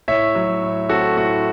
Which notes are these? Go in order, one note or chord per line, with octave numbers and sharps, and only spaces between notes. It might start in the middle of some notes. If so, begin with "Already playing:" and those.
A2 C#5 E5
F#3
A2
C4 F#4 A4
A2 F#4